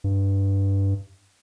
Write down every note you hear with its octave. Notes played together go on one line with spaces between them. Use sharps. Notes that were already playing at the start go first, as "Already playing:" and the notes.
G2